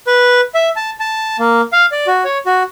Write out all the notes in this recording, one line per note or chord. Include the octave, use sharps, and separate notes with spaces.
B4
E5
A5
A5
A#3
F5
D5
F#4
C#5
F#4